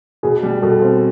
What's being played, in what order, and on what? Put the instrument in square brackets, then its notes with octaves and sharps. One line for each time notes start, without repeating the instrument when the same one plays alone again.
[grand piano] B2 [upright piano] G#4
[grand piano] G3
[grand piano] B2 [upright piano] A4
[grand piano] C4